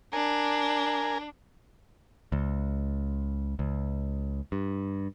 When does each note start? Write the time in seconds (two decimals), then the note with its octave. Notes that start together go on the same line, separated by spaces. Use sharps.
0.13 D4 A#4 G#5
2.32 C#2
3.59 C#2
4.52 G2